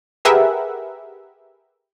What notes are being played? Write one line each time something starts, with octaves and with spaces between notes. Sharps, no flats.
G4 G#4 A#4 B4 E5 F#5